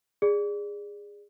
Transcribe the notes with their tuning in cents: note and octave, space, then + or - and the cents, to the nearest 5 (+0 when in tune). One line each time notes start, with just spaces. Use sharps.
G#4 -20 D5 +0